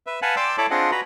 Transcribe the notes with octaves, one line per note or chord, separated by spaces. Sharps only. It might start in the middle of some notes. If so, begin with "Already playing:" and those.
B4 E5
B4 F5 F#5 G#5 A5 B5
D5 G5 C6 D6 E6
E4 A4 C#5 A5 B5 D6
C4 D4 F4 G#4 D#5 F#5
F#4 B4 A#5 B5